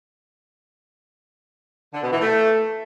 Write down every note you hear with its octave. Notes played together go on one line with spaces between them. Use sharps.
D3
B2
E3
A3